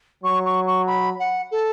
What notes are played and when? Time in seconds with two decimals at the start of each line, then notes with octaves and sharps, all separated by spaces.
0.24 F#3 C#6
0.45 C#6
0.67 C#6
0.87 B5
1.19 F#5
1.51 A4